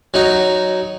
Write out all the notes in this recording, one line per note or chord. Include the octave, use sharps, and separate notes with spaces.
F#3 D#4